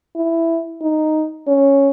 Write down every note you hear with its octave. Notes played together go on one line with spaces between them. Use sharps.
E4
D#4
C#4